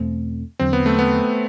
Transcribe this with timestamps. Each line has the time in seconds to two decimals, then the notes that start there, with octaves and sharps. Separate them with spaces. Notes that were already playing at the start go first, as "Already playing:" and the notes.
Already playing: E2 B2 A3 C4
0.60 E2 D3 F#3 C4
0.73 B3
0.86 A3
0.99 B3